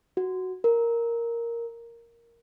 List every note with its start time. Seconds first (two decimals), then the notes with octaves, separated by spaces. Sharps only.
0.17 F#4
0.64 A#4